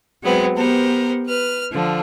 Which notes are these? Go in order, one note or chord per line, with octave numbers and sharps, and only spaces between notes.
F#3 G#3 B3 C4
B3 G4 A#4 C5
B4 F6
D3 F3